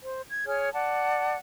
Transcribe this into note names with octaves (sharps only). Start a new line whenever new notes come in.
C5
G#6
G#4 C#5 F6
D5 F#5 A5